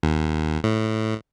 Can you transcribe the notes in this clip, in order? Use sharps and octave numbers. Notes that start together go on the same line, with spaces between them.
D#2
A2